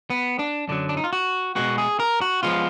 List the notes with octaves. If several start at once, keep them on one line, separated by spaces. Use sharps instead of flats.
B3
D4
F#2 D3 F#3 D4
D4
D#4
F4
F#4
B2 G#3 B3 F#4
G#4
A#4
F#4
F3 G#3 B3 F4